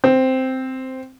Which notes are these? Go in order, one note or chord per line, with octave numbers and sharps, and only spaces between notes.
C4